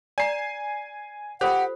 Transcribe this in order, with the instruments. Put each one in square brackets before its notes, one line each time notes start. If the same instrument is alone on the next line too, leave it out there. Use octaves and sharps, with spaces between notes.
[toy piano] D5 A#5 [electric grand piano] G#5 C7
[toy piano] F4 A4 C5 [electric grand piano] G4 [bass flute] F#5